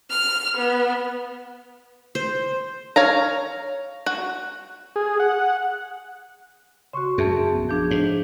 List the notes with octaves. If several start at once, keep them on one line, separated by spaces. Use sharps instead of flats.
F6
B3
C5
C#5 F5 A#5
F#4
G#4
F#5
C#3 F#4 C6 C#6
F#2 G#4 E5 A5
A#1 B3
F3 D4 G#4 G6
G#2